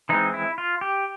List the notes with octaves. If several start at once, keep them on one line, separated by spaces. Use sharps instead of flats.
E3 G#3 C4 D#4
E4
F4
G4